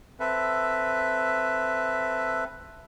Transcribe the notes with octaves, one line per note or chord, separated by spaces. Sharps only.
C4 A4 B4 E5